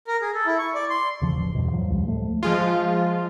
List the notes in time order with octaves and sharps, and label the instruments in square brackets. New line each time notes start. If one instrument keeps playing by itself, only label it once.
[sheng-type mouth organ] A#4
G#4
A4
E4
C#6
D5
C6
[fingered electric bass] D#2 C#3 F3
E1 A1
E2 G2 B2
E2 G#2 F3 F#3
C#2 F#2 G3
A2 F3 G#3 A3
[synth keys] F3 G#3 F4